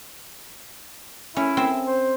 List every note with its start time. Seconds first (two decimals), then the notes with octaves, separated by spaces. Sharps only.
1.36 C#4 E4
1.57 C4
1.87 C5